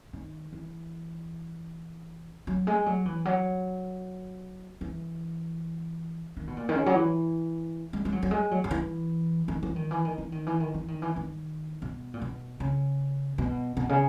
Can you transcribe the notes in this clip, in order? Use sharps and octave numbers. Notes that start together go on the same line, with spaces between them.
D#3
E3
F#3
G#3
F#3
E3
F#3
E3
D#3
B2
A#2
D#3
C#3
F#3
E3
G#3
G#3
F#3
F#3
G#3
F#3
F#3
E3
D#3
E3
D#3
E3
D#3
E3
D#3
E3
D#3
E3
D#3
E3
D#3
B2
A#2
B2
C#3
B2
B2
C#3